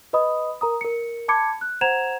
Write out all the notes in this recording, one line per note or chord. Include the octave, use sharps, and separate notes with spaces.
B4 D#5 B5 D#6
A#4 A#5 D#6
A#4 C#7
A5 B5 D6 G#6 C#7
F#6
C5 F#5 A#5 G#6 E7 F7